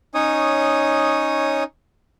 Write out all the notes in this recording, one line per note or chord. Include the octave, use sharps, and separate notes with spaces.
C#4 D#4 C#5 D#6